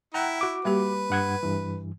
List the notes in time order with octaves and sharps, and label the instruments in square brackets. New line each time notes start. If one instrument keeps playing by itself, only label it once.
[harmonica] E4 [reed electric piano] F#5 G5 A#5
[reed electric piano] F#4 D6
[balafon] G3 A#3 G4 [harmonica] B4
[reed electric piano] G2 F#5 G#6
G2 E3